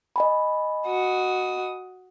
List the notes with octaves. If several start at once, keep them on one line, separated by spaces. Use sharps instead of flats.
D#5 G#5 B5
F#4 D#6